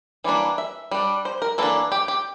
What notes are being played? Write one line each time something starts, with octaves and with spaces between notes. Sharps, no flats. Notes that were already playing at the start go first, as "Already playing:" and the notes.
E3 G3 A#3 D4 D5
E5
G3 D4
C5
A#4
E3 A#3 D4 A4
G4
G4